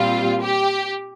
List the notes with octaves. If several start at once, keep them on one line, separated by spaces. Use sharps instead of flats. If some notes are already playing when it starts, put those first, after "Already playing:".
Already playing: A#2 G3 C4 F4
G4